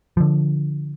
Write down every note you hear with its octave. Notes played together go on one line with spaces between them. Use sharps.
D3 F3